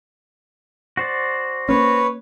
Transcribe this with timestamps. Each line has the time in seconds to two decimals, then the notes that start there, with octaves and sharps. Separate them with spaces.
0.97 F#4 C5 D5
1.69 A#3 B3 C#4 B4 C#5